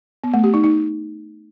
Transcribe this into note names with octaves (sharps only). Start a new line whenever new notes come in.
B3
A3
G4
D#4
D#4